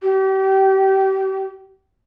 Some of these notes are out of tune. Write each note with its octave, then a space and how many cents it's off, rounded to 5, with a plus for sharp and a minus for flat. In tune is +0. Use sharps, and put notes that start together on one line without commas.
G4 -30